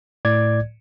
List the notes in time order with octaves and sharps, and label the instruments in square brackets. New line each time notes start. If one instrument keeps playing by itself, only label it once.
[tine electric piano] A2 D5 G#6